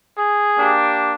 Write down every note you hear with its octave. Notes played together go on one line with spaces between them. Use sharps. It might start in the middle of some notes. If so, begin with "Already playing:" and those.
G#4
A#3 D4 G4